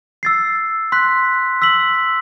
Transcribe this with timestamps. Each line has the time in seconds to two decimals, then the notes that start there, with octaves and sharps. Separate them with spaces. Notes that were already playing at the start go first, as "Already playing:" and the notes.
0.23 E6 A6 C7
0.92 C6 F#6 B6
1.62 E6 B6 F#7